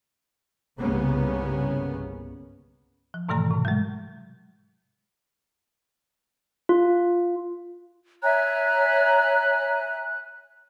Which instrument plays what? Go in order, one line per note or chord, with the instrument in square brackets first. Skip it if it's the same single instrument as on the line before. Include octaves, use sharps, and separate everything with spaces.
[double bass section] G1 C2 C#3 A#3 B3 C#4
[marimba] F3
G#2 B2 D#3 E3 A3 A#5
G#2 C3
F#3 G#3
[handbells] F4
[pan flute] C#5 [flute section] E5 G#5 A#5 [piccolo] F#6